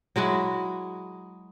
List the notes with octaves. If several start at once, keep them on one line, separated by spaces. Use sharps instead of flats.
F#3 G#3 E4 F#4